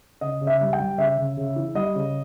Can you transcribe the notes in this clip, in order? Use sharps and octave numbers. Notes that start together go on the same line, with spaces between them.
C#3 D#5
C#3
E5
G3
G5
G3
C#3 E5
C#3
C#3
E3
G3 D#5
C#3